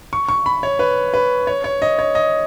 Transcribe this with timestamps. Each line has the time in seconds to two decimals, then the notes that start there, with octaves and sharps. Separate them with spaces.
0.13 C#6
0.29 C#6
0.46 B5
0.63 C#5
0.79 B4
1.14 B4
1.47 C#5
1.64 C#5
1.82 D#5
1.99 C#5
2.15 D#5